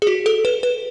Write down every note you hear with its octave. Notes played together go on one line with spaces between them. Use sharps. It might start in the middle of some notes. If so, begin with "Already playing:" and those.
G#4
F#4
A4
B4
B4